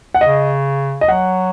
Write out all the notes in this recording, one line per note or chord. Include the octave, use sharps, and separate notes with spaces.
F#5
C#3 D#5
D#5
F#3 F#5